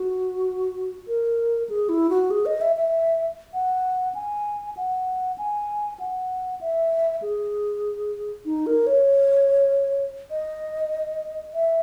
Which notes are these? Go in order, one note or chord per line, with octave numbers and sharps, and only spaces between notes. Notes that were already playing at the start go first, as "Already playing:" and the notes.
Already playing: F#4
A#4
G#4
E4
F#4
G#4
D#5
E5
E5
F#5
G#5
F#5
G#5
F#5
E5
G#4
D#4
A#4
C#5
D#5
E5